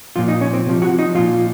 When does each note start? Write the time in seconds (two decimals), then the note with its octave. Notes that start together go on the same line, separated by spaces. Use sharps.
0.16 A#2 F3 F4
0.28 D#4
0.41 C#4
0.53 C4
0.66 C3 F3
0.82 F#4
0.99 D#4
1.15 A#2 F3 F4